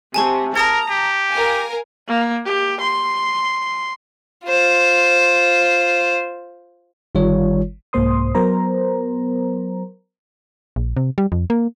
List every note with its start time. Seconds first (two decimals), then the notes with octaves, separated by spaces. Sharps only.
0.14 C3 G#5 A5 C#6
0.55 A#4 A5 A#5 D#6 G#6
0.90 G4
1.30 A#4 F5 G#5
2.08 A#3
2.45 G4
2.81 C6
4.47 F4 C5
7.15 G1 D#3 G3 F4 C#5
7.93 C2 G#2 A#3 C5 C6 D#6
8.35 F#3 B3 A#4 C5 A#5
10.76 A#1
10.97 C3
11.18 G3
11.32 F2
11.50 A#3